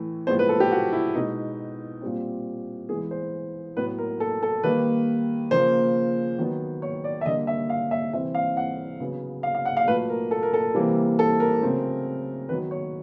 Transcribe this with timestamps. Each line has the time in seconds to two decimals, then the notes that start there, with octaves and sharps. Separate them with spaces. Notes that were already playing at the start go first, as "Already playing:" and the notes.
Already playing: A2 E3 A3
0.27 A2 F3 G#3 B3 C5
0.39 B4
0.49 A4
0.60 G4
0.71 F#4
0.93 E4
1.15 B2 G#3 B3 D#4
2.01 A#2 G3 C4
2.89 E3 G#3 B3 G#4
3.11 C5
3.76 A2 F#3 B3 B4
3.98 A#4
4.20 A4
4.43 A4
4.63 D#3 G3 A#3 B4
5.51 C#3 F3 A#3 C5
6.38 D#3 F#3 B3
6.82 C#5
7.04 D5
7.21 E5
7.26 D3 G3 A#3 D#5
7.47 E5
7.70 F5
7.91 E5
8.13 C3 E3 G3 C4 E5
8.35 F5
8.57 F#5
9.00 C#3 F#3 B3
9.43 F5
9.55 F5
9.65 F#5
9.77 F5
9.87 A#2 F#3 A3 B4
10.10 A#4
10.31 A4
10.43 A#4
10.54 A4
10.74 C3 E3 G3 A#3
11.19 A4
11.40 A#4
11.62 C#3 F#3 A3 C4
12.49 D#3 F#3 B3 B4
12.71 C#5